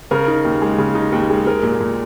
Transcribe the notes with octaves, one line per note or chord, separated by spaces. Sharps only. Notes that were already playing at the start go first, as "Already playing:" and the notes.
C#3 A#4
D#4
D#2
G#3
C#3
D#4
D#2
G#3
G#3 A#4
A#2
A#2